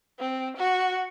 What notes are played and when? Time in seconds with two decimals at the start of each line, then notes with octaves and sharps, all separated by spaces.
0.19 C4
0.57 F#4